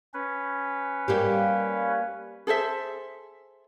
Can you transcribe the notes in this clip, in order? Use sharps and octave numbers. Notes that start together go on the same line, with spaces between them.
C#4 B4
G3 A#3 G4
G#4 A4 C5 E5